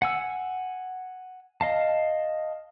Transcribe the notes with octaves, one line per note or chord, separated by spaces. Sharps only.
F#5 G#5 E6
D#5 F5 A5